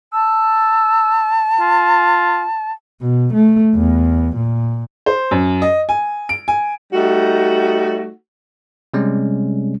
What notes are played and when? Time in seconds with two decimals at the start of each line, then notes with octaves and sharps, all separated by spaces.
0.13 A5 E6
1.60 F4
3.01 B2
3.34 A3
3.76 E2
4.36 A#2
5.06 C5
5.31 F#2
5.62 D#5
5.89 G#5
6.29 D7
6.48 G#5
6.93 G3 A3 D#4 F#4
8.94 C3 G3 G#3 C#4